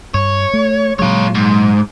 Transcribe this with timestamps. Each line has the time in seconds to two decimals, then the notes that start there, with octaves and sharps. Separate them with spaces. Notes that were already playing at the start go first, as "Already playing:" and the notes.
0.14 G2 C#5
0.53 A3
0.99 A#2 F#3 G#3 F4 C#5
1.35 G#2